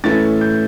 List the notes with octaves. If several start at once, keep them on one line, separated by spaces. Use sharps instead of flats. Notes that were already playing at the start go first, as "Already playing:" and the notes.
A2 E3 A3 C#4 A6
G6